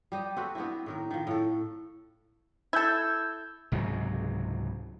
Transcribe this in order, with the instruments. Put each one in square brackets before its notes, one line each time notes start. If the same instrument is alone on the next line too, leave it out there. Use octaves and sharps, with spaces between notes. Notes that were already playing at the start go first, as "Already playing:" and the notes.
[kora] G3 G4 D#5
C4 F#4 A4 B4
B3 C4 D4 E4
A2 D#3 A#4
D#3 F3
A2 A4
[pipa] E4 A4 [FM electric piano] E6 G6 G#6
[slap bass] C#2 G#2 C3 F#3